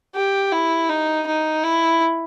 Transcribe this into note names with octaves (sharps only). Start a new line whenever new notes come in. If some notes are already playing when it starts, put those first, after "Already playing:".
G4
E4
D#4
D#4
E4